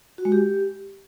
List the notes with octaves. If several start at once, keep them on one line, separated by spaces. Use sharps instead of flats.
F#4
G#3
G4